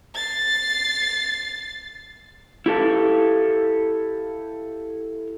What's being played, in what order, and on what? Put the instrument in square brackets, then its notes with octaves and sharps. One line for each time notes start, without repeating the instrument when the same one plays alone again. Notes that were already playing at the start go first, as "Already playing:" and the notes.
[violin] A6 C7
[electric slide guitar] E4 G4 A4 F5